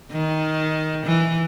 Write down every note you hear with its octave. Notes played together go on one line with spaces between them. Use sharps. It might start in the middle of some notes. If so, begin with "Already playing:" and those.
D#3
E3